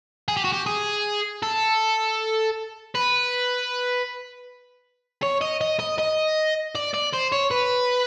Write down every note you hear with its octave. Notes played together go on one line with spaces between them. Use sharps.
G#4
G4
F#4
G4
G#4
A4
B4
C#5
D#5
D#5
D#5
D#5
D5
D5
C5
C#5
B4